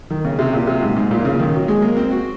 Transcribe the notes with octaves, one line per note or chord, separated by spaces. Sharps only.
D#3
C#3
C3
A#2
C3
G#2
G#2
A#2
C#3
D#3
F#3
G#3
A#3
C4
F#4